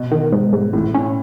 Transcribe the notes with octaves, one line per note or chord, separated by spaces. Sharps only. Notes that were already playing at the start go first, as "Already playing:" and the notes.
Already playing: B2
D#3
G#2
G#2
A1 A2
C#4